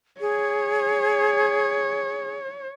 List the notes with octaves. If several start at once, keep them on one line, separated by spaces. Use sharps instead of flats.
G#4 C#5